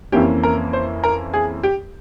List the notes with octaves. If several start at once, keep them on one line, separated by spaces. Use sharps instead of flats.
F2 E3 A#3 C#4 G4
A#4
C5
A#4
G#4
G4